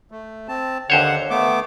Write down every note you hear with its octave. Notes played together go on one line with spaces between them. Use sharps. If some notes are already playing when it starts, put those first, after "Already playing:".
A3
C4 A5
D#2 D3 C5 C#5 F#5
A3 B3 D6